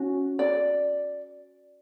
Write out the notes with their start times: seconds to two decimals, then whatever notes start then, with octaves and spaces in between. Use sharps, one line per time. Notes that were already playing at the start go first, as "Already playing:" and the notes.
Already playing: C#4 F#4
0.39 D5